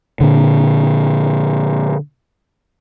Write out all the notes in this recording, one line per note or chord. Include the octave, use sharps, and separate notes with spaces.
A#2 D3